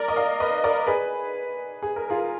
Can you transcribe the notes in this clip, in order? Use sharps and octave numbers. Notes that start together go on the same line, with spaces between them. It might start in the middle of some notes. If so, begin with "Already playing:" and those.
Already playing: A#4 D5
D#5
D5 F5
B4 D#5
A#4 D5
G#4 B4
G#4
A#4
F4 G#4